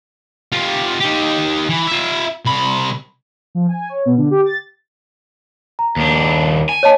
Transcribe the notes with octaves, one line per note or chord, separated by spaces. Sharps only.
F4 G4
D#4 G4
E3
F4 E5
C2 B5
F3
G#5
C#5
B2
D3
G4
A6
A#5
D#2 D4
G#5
C#5 D#5 A5